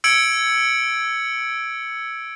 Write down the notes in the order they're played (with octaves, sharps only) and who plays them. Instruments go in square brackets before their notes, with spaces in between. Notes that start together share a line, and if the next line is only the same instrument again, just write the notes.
[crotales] E6 G#6 C#7 D7 F#7